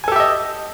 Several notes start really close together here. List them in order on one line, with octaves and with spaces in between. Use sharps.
G#5 A4 G4 E5 D#5